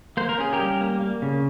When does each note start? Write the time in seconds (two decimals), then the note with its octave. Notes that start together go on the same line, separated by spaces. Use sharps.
0.17 A#3 C5
0.29 A#4
0.38 C#4 G#4
0.53 G4 A#4
0.59 G3
0.81 A#3
1.01 A#3
1.22 C#3